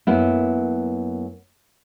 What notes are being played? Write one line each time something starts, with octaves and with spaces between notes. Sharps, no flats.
F#2 A#3 B3 E4